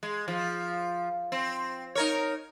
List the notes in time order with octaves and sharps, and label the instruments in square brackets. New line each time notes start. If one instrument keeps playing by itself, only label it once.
[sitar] G#3
F3
C4
D#4 A#4 C#5